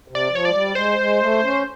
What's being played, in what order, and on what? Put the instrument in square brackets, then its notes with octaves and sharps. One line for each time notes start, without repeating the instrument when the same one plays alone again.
[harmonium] C3
[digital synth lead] D5
[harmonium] F3
[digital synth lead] C#5
[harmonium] G#3 [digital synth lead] D5
[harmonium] G3
[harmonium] G#3 [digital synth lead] C5
[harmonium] G#3
A3
C#4